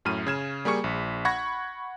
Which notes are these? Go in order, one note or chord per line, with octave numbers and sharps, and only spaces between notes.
F#2 A2 F6 D#7
C#3 G#6 E7
G3 A#3 G#4 C#6 C#7
A#1
F#5 B5 C#6 G#6 A#6